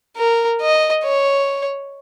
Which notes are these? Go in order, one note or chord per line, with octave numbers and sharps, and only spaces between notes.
A#4
D#5
C#5